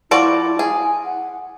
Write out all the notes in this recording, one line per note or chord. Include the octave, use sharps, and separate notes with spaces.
F3 E4 F#4 D5
G#4 G#5
F#5